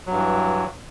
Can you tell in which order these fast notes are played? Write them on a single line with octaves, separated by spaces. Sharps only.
F#3 G2 E3